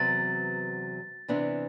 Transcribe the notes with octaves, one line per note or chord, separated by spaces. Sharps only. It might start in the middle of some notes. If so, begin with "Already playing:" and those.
Already playing: E2 C3 F#3 B3 A6
C3 E3 B3 D4